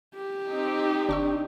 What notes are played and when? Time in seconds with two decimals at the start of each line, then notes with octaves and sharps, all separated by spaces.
0.16 G4
0.49 C4 D#4
1.09 G1 D4 C#6 E6